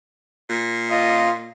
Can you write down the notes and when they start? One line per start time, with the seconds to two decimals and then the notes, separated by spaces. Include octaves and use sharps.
0.49 A#2
0.91 F4 D#5